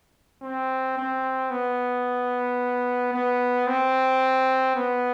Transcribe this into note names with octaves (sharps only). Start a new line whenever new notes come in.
C4
C4
B3
B3
C4
B3